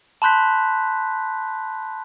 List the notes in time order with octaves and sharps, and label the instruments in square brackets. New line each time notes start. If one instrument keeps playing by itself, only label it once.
[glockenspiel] A5 B5 C6 F#6 G6 B6